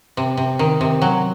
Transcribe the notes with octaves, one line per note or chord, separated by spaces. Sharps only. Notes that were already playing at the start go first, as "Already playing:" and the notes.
C3
C3
D#3
C3
F#3